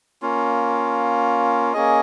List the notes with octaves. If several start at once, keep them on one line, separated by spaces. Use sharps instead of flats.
A#3 C#4 F4
A#3 C#4 G#4 D#5